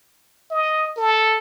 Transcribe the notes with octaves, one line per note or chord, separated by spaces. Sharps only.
D#5
A4